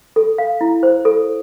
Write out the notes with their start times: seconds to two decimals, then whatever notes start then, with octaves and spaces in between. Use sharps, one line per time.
0.16 A4
0.38 F5
0.61 E4
0.83 C5
1.05 A4